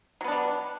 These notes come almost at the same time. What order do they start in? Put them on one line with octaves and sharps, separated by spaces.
F#3 B3 D4 G3